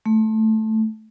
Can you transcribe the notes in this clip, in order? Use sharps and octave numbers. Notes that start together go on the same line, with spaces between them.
A3